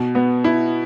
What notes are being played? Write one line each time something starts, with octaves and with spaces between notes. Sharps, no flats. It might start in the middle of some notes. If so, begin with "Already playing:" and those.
Already playing: B2
B3
E4